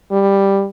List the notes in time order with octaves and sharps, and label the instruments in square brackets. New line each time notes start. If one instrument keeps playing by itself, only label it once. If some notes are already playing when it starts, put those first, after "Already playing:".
[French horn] G3